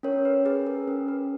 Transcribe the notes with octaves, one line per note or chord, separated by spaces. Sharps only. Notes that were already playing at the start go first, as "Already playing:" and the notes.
C#4 A#4 C#5
B4
G#4 B4
A#4
C#4
B4